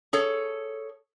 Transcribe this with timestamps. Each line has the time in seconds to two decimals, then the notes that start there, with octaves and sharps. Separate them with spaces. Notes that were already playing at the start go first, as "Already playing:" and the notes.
0.13 G#4 A4 C#5